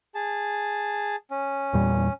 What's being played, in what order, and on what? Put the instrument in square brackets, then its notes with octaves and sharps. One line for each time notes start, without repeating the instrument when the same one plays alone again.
[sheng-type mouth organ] G#4 A5
C#4
[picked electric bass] E2 A#2 G3